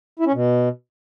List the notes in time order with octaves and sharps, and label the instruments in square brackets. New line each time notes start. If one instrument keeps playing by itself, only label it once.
[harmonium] E4
C#4
B2